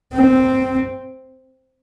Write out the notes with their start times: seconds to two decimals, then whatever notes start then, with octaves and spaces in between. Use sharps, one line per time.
0.13 C4